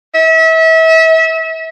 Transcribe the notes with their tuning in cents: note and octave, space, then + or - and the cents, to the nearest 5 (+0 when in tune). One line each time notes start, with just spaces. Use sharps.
E5 -35